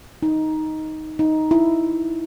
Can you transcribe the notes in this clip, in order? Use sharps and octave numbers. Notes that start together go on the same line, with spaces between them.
D#4
D#4
E4